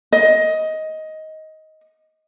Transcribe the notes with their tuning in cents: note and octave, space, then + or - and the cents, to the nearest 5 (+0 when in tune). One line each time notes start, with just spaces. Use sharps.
D#5 +15